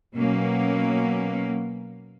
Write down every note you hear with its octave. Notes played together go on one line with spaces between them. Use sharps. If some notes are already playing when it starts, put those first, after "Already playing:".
B2 F#3 A#3 C#4